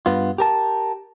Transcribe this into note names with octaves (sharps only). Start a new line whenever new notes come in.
G2 B3 F4
G4 A#4 A5